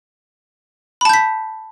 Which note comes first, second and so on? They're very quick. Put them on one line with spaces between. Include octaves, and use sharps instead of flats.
B5 A5 G6 B6